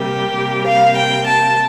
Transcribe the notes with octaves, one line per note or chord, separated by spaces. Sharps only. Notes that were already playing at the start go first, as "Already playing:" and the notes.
Already playing: C3 G3 A#3 G4
C3 G3 A#3
F5
G5
A5